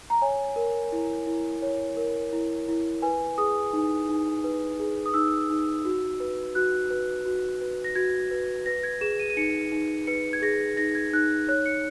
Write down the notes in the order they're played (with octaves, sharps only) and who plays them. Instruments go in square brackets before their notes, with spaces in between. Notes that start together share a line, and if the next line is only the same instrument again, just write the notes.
[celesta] A#5
C#5 G#5
A#4
E4
E4
C#5
A#4
E4
E4
B4 G#5
G#4 D#6
D#4
D#4
B4
G#4
D#6
D#4 E6
D#4
F#4
B4
F#4 F#6
B4
F#4
B4
A#6
F#4 G#6
B4
B4 A#6
G#6
G#4 E7
D#7
D#7
D#4 C#7
D#4
B4 C#7
G#6
G#4 A#6
D#4 A#6
G#6
D#4 F#6
C#5 F#6
C#7